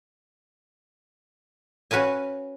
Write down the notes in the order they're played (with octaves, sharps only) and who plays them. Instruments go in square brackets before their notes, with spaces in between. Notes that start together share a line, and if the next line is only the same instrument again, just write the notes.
[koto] C#4 F#4 B4 F5 G#5